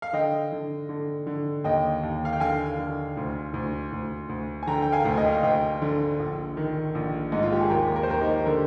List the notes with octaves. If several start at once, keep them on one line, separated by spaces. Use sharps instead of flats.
F5
D3 D#5 G5
D3
D3
D3
D#2 D#5 G5
D#2
F5
G5
D3 F5 G#5
D3
D2
D2
D2
D2
G#5
D3 G5 A#5
G5
F5 G#5
D2
D#5 G5
F5
D2 D#5 G5
D3
A#1
D#3
A#1
G#2 D#4
F4
G4
G#4
D#2 G4 A#4
A#4
C5
D#2 G4 A#4
D#4 G4
D3 G4 A#4